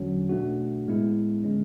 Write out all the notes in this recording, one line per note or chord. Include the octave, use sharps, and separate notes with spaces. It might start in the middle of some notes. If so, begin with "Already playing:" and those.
Already playing: E2 D3 F#3 C#4
B2 A3 D4 F#4
A2 G#3 B3 E4
D3 G#3 C#4